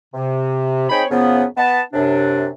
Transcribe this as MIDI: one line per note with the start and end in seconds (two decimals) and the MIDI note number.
0.14 0.89 48
0.90 1.04 60
0.90 1.04 63
0.90 1.04 68
0.90 1.04 73
0.90 1.04 79
0.90 1.04 83
1.10 1.44 42
1.10 1.44 49
1.10 1.44 53
1.10 1.44 59
1.57 1.82 59
1.57 1.82 81
1.93 2.48 42
1.93 2.48 48
1.93 2.48 62